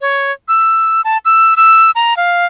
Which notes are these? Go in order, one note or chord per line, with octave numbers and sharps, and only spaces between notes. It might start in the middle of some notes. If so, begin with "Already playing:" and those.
C#5
E6
A5
E6
E6
A#5
F5